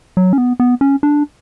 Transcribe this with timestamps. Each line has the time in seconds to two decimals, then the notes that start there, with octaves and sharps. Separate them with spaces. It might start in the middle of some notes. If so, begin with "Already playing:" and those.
0.17 F#3
0.33 C#4
0.38 B3
0.60 B3
0.81 C#4
1.03 D4